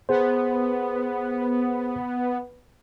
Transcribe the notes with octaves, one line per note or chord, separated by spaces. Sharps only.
B3 G#4 C5